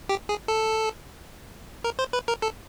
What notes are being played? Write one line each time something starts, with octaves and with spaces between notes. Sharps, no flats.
G4
G#4
A4
A#4
C5
B4
A#4
A4